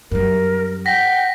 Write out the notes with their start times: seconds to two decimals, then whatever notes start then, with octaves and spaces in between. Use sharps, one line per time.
0.11 F#2 G3 A#4
0.86 F#5 G5 A#6 B6